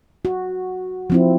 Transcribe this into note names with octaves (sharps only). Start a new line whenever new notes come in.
F#4
F3 C4 E4